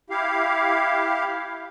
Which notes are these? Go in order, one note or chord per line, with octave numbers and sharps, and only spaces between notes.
E4 G4 F5